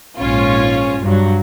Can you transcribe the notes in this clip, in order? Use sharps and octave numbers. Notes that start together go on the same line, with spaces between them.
A#1 G#2 C#4 F4 C#5
G2 F#3